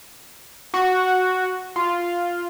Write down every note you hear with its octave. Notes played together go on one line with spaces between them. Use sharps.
F#4
F4